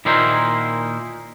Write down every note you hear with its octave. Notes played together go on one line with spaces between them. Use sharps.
A#2 D#3 A#3 D#4 E4 C5